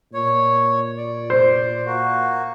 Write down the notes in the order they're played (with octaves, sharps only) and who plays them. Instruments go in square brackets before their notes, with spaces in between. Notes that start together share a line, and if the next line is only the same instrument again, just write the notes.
[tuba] A#2 [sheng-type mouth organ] C#5
[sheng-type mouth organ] D5
[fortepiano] C5
[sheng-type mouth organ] A#3 F#4